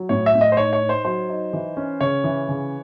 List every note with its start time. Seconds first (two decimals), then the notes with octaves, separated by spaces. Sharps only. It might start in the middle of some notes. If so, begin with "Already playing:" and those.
Already playing: F#3
0.09 A2 C#5
0.26 E5
0.34 A2
0.41 D#5
0.52 C5
0.57 D#4 C#5
0.73 C#5
0.81 D#4
0.89 C5
1.05 F#3 C5
1.29 D#4
1.53 E3
1.77 C#4
2.01 C#3 C#5
2.24 E3
2.49 C#3